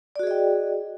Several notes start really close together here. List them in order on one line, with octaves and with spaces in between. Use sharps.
D5 F#4 G#4 D#5 G5